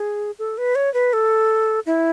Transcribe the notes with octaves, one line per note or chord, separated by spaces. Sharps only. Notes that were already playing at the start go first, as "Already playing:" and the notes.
Already playing: G#4
A4
B4
C#5
B4
A4
E4